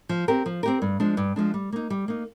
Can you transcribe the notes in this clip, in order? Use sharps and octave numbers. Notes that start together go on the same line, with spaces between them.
F3
C4 G4 A#4
F3
C4 G4 A#4
G2
F3 G#3 D4
G2
F3 G#3 D4
G3
A#3 D#4
G3
A#3 D#4